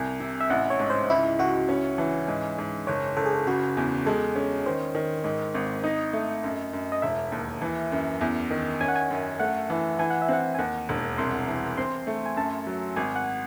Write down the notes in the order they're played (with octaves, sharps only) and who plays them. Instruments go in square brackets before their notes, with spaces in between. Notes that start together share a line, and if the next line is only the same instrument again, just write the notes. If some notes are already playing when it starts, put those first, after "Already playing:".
Already playing: [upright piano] C2 [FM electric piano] G#5
[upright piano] C3
[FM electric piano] E5
[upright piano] A1 [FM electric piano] F#5
[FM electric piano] C#5
[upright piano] G#2
[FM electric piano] C5
[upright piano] C#2 [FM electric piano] E4
[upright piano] C#2 [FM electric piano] F#4
[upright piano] C#4
E3
G#2
G#2
[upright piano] F#1 [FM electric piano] C#5
[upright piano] F#1 [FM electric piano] A4
[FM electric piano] G#4
A4
[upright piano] C#3 [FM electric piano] F#4
[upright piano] E2
[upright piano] G#3 [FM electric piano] A4
[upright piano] C#4
[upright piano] D#3 [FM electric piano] C5
[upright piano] D#3
G#2
G#1
[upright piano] D#4 [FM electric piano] D#5
[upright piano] A3
F#2
F#2
[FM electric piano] D#5
[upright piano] E1 [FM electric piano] E5
[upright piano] D#2
E3
F#2
E2
D#3
[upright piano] C#4 [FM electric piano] G#5
[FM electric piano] F#5
G#5
[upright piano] F#2
[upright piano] A3 [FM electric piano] F#5
[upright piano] E3
[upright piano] E3 [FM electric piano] G#5
[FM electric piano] F#5
E5
[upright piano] C4 [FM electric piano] F#5
[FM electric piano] G#5
[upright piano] D#2 [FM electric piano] F#5
[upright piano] E1
[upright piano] C2 [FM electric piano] C6
[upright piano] E3
[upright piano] C4 [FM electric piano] C6
[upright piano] A3
[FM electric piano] G#5
[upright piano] F#2 [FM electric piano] A5
[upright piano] F#3
[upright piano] G#1 [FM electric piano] G#5
[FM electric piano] F#5